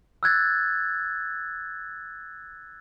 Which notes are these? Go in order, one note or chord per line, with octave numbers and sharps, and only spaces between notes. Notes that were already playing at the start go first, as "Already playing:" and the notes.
E6 F#6 G#6 A6